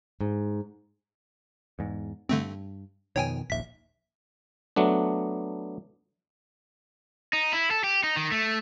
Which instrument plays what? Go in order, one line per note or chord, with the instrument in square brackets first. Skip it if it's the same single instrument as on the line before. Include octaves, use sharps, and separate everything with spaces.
[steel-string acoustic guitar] G#2
[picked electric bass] E2 G#2
[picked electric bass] G2 [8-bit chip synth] D3 A3 C4
[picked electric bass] F2 B2 D#3 [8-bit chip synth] C#5 G5 G#5
[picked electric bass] D#1 A#1 D#2 [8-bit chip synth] E5 B6
[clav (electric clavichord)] F#3 A3 B3 D4
[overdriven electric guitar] D#4
E4
A4
G4
D#4
D#3
A3